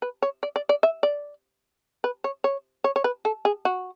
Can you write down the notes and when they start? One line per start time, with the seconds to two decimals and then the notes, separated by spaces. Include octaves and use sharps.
0.02 B4
0.22 C#5
0.43 D5
0.56 D5
0.69 D5
0.83 E5
1.03 D5
2.04 B4
2.24 C#5
2.44 C#5
2.84 C#5
2.96 C#5
3.04 B4
3.25 A4
3.45 G#4
3.65 F#4